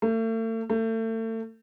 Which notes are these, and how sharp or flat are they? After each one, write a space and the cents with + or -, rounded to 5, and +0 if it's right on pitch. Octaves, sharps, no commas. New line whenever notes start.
A3 +40
A3 +35